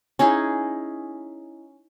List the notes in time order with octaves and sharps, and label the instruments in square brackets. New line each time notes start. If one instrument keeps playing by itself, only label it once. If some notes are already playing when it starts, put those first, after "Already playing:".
[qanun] C#4 D#4 E4 G#4